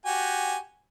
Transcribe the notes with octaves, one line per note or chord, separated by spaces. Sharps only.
F#4 G4 G#5